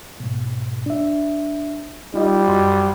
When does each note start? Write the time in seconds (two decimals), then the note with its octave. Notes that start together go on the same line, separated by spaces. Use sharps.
0.20 G#2 B2
0.86 D4 E5
2.14 G3 D#4 F4 D#5
2.48 F#2 F#4 C6